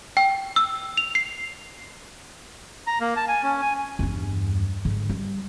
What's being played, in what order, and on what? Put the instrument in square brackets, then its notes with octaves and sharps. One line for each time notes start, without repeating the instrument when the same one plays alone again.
[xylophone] G5
E6
F7
C7
[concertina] A#5
A#3
A5
G#5
C#4
G#5
[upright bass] E2 G2
G#2 D3
G3